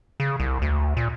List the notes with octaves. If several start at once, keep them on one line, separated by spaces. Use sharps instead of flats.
C#3
C2
D2
A#2